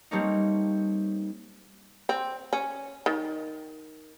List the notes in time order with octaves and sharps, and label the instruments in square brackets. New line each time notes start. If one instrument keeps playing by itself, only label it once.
[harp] G3 A3 A#3 C4 C#4 D#4
[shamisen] C4
C#4
D#3